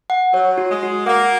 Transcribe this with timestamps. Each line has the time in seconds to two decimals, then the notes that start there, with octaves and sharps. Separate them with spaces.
0.10 F#5
0.33 F#3 C#5
0.58 F#4
0.70 G#3
0.83 F#4
1.06 A#3 F#5